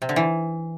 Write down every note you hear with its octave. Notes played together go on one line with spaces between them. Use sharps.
C3
D3
E3